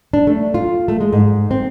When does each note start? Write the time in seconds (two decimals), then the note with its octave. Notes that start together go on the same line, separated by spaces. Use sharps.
0.13 D4
0.27 A3
0.54 F4
0.88 A3
1.01 G#3
1.13 G#2
1.51 C4